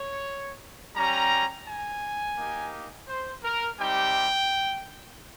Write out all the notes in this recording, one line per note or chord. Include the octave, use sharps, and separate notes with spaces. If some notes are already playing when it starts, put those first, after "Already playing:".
Already playing: C#5
G3 C#4 G4 A#5
G#5
A#3 D#4 G4
C5
A#4
G3 C4 D#4 G4 G5